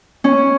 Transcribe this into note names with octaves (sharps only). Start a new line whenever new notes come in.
C#4